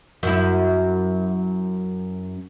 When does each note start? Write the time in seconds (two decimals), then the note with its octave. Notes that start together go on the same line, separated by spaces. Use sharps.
0.23 F#2 E4